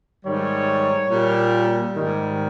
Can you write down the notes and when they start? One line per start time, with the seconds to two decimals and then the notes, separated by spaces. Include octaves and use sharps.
0.24 G#2 D#3 G3 C#5
1.10 A#2 G3
1.96 G#2 D#3 G3